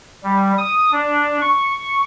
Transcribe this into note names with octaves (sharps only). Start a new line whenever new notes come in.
G3
D#6
D4
C#6